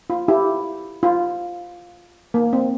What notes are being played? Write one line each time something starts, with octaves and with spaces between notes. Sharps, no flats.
F4
E4 G4
F4
A#3
C4